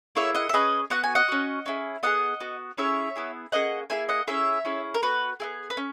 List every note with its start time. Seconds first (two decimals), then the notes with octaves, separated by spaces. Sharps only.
0.15 A#3 E4 G#4 C#5 E5
0.35 D#5 F#5
0.49 E5
0.53 C#4 G#4 B4 D#5
0.90 B3 F#4 F#5
1.04 G#5
1.15 D#5 F#5
1.28 C#4 F#4
1.66 C#4 E4 G#4
2.03 B3 E4 G#4 D#5 F#5
2.40 B3 F#4
2.77 C#4 E4 G#4 C#5 E5
3.16 B3 E4 G#4
3.52 A#3 C#4 G#4 D#5 F#5
3.90 A#3 E4 G#4 E5 G#5
4.09 D#5 F#5
4.27 C#4 E4 G#4 C#5 E5
4.65 C#4 E4 G#4
4.94 A#4
5.02 B3 F#4 B4
5.40 B3 E4 G#4
5.70 B4
5.77 C#4